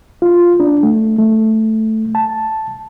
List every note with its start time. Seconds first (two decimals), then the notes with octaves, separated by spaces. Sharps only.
0.22 F4
0.60 D4
0.83 A3
1.18 A3
2.15 A5